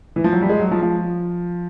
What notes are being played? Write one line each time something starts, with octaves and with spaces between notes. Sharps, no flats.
E3
F3
F#3
G3
G#3
F#3
F3
F3